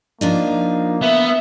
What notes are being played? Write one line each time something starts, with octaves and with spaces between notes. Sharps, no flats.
F3 A#3 D4 D#4
B3 E5